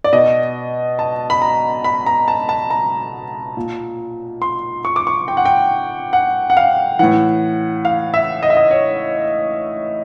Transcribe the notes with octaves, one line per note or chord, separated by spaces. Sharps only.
D5
B2 D#5
A5
B5
A#5
B5
A#5
A5
A5
A#5
A#2
C6
C#6
D6
C#6
G5
F#5
G5
F#5
F#5
F5
A2 E3 F#5
F5
E5
D#5
E5
D#5
C#5